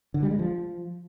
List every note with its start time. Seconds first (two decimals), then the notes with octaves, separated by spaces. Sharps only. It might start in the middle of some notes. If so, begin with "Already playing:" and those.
0.14 D3
0.23 G3
0.31 G#3
0.39 F3